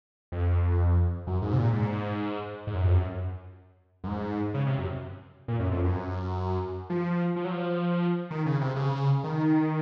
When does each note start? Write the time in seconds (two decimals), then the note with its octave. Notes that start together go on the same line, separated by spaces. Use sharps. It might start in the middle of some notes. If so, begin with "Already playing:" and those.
0.32 F2
1.27 F#2
1.42 G#2
1.53 C3
1.58 A#2
1.73 G#2
2.67 G#2
2.75 F#2
2.84 F2
2.91 F#2
4.04 F#2
4.07 G#2
4.54 C#3
4.67 C3
4.79 F#2
5.48 A#2
5.60 F#2
5.72 F2
5.84 F#2
6.90 F3
7.36 F3
7.45 F#3
7.52 F3
8.30 D#3
8.46 C#3
8.61 C3
8.76 C#3
9.24 D#3